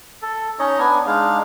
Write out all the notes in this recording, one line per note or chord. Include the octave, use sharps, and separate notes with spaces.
A4
C#4 D#4 C#5 D#5
B3 D4 G#5
G#3 D4 D#4 F5